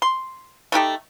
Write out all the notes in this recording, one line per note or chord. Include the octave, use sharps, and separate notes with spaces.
C6
A3 D#4 G4 A4